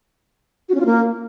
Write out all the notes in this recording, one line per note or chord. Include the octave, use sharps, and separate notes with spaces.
F#4
C#4
F4
A#3